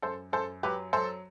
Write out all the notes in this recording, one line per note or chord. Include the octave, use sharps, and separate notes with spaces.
F#2 A4 C5
F#2 A4 C5
F#3 G4 B4
F#3 A4 C5